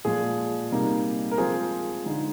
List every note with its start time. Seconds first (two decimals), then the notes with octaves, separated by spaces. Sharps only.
0.05 A#2 F3 G#3 G#4
0.71 C3 G3 A#3 D#4
1.31 A#4
1.38 F3 G#3 C4 F4 G#4 C5
2.05 D3 G#3 D#4